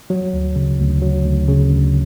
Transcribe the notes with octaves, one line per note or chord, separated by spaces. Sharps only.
F#3
D2
C#3
D2
F#3
D2
C#3
D2